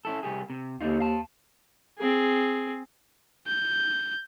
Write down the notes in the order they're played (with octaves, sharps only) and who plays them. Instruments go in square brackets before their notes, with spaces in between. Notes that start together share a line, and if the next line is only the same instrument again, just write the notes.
[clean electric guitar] C#4 E4 A4
C2 G4 G#4
C3
[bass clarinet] D#2 [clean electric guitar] D3 D#4 F4
[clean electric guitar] F5 A5
[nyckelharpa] C4 G#4
[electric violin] G6